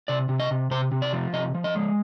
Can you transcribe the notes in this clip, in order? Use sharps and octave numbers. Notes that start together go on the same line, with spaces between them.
C3 D5
C3
D#5
C3
C3 C5
C3
D5
F3
C3 D#5
F3
D#5
G#3